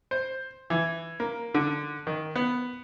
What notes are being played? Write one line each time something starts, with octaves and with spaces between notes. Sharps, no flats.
C5
E3
A#3
D3
D#3
B3